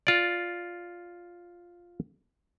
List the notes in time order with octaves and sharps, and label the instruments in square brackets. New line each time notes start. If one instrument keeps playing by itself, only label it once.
[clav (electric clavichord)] F4 D5